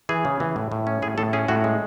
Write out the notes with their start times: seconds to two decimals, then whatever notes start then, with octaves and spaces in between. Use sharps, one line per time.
0.09 E3 G#4
0.25 C#3
0.40 E3
0.56 A2
0.72 A2
0.87 C#4
1.02 A2 G#4
1.18 A2 A4
1.33 C#4 G#4
1.48 A2 F#4
1.64 G#3